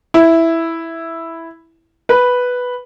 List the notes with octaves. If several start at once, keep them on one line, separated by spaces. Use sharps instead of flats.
E4
B4